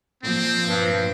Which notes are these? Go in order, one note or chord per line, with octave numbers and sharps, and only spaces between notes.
A#2 F3 C4
G2